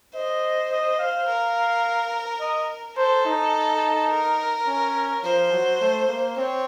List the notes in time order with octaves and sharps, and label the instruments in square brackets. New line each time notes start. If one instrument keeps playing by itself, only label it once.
[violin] C5 [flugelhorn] D#5
[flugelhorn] D#5
F5
[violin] A#4
[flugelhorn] D#5
[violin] A4 [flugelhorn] C5
[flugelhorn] D#4
[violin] A#4
[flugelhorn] C#4
[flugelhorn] F3 [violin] C5
[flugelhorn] F#3
A3
A#3
[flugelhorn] C4 [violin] C#5